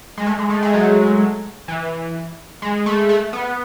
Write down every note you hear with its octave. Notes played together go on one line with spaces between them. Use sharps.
G#3
A3
G#3
A3
G#3
F#3
E3
G#3
A3
A3
B3